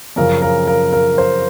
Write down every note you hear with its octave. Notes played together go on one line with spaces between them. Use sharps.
F#2 C#3 F3 A#4
A#4
A#4
A#4
C5